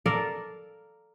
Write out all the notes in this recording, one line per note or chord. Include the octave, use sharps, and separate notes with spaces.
A4 A#4 D5 F5